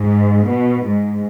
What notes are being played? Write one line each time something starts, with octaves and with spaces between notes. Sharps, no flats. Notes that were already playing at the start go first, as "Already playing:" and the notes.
Already playing: G#2
B2
G#2